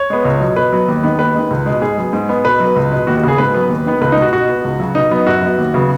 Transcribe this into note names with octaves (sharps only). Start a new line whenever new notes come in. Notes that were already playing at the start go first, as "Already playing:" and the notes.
Already playing: C#5
G#3 B3
C#2
B2 F#3
B2 B4
F#3 B3
D#2
D#3 G#3 B3
D#2 B4
D#3 G#3
C#2
B2 G#3
G#2 G#4
F#3 B3
G#2
G#3 B3
B2 B4
F#3 B3
C#2
B2 G#3
D#2 F#4
F#4
C#3 B3 G#4
G#2 B4
F#3 B3
D#2
D#3 B3
C#2 B4
D#4
B2 G#3 F#4
B2 F#4
B3
C#2
C#3 F#3
B2 D#4
F#3 B3
F#2 F#4
F#3 B3
D#2
C#3 F#3 B3